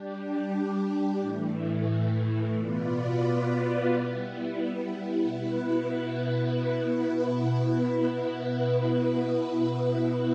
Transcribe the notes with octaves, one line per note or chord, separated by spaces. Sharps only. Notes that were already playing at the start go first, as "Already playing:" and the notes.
Already playing: G3 D4 G4
A2 E3 A3
B2 B3 F4 B4 D5
G3 B3 E4
B2 B3 E4 B4